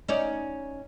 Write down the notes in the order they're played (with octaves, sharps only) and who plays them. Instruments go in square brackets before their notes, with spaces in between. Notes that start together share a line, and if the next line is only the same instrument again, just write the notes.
[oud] C#4 D#4 D5